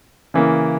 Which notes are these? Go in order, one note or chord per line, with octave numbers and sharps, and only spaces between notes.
C#3 E3 A#3